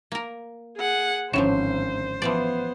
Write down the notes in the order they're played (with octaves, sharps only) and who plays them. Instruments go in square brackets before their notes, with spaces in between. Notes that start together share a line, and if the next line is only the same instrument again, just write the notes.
[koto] A#3 A#4
[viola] G#4 F#5
[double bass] G#1 [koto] A2 D3 F3 [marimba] C#4 C#5 [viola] C5
[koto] E3 F3 D5 [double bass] B3